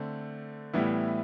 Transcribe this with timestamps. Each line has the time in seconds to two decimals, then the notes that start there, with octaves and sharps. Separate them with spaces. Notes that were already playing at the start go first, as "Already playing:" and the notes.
Already playing: D3 A3 C4
0.73 A2 E3 G3 B3 E4